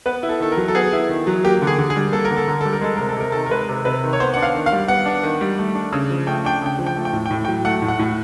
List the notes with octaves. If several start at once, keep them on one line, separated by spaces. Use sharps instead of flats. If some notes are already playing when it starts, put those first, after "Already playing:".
B3 B4
E4
A4
D#3 A4
A#4
F#3
A4
B3 G#4
E4
D#3
F#3
A#3 G4
D3
G#4
D3
G#4
G3
A#3 A4
A#4
D3
A4
D3 A#4
G3 A4
A#4
G#3 A4
C3 A#4
A4
C3 A#4
D#3 A4
A#4
G#3 B4
C3
C3 B4
D#3
C#5
B3 C5
D4 F#5
F5
D#3
F5
G3
B3 F#5
D4
D#3
G3
A3
D4
C#3
F3
A3 G5
D4 G5
C#3 G5
F3
G5
A3
G5
A2
G5
A2
G5
F#3
A3 F#5
A2
F#5
A2